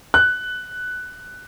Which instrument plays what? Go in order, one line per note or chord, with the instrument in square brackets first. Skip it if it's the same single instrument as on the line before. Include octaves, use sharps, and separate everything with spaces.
[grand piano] F#6